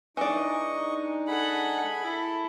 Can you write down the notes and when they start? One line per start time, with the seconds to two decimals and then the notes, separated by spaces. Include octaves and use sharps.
0.17 E3 G#3 D4 D#4 D5 D#5 C#6
1.28 G#4 A4 F#5 B5
2.01 E4 A4